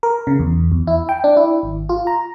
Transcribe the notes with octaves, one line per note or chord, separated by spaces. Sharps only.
A#4
C#3
E2
E2
E4
G5
D4
E4
G#1
F4
A#5